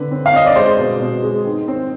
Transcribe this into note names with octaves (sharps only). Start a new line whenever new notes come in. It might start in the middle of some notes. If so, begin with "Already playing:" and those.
Already playing: D3 C4 B4
C4
F5
C4 D#5
D5
G#3 C5
B2
B2
G#3
D#3
C4